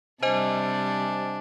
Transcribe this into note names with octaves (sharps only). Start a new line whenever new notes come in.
C3 G3 D4 C5 D#5 G#5